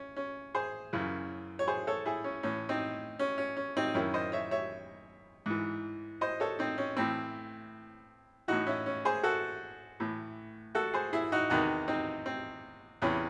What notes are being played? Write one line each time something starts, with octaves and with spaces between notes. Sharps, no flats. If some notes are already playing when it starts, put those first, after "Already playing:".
Already playing: C#4
C#4
G#4 C5
F#2 C#3 E3
C#5
G#4 C5
A4 C#5
E4 G#4
C#4
A2 E3 C#4
C4 D#4
C#4
C#4
C#4
C4 D#4
F#2 D#3 C#4 E4
C5 D#5
C#5 E5
C#5 E5
G#2 E3
C5 D#5
A4 C#5
C4 D#4
C#4
A2 E3 C4
A2 E3 D#4 F#4
C#4 E4
C#4
G#4 C5
F#4 A4
A2 E3
F#4 A4
G#4 C5
E4 G#4
D#4 F#4
E2 C3 D#3 D#4 F#4
C4 D#4
C4
E2 C3 E3 C#4